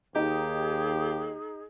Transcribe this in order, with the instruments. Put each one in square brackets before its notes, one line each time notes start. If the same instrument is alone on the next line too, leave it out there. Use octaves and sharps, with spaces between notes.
[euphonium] D#2 [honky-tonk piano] D#4 [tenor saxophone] G4 [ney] G#4